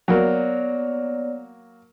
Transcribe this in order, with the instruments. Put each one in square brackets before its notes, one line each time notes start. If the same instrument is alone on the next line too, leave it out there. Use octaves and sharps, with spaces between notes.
[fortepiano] F#3 A#3 [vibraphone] B3 C#5 D5